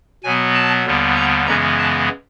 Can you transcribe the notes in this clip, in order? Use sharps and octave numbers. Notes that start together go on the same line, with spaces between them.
B2 F#3 B3 G#5
A5
D#2 D3 G3 B3
A#5
F#2 C#3 E3 G#3 B3 A#5
A5